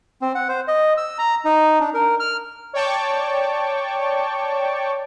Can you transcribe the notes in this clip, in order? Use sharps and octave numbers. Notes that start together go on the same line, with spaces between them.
C4
F#5
C5
D#5
E6
A#5
D#4
D4
A#4
F6
C#5 D5 G5 A5 C#6 D6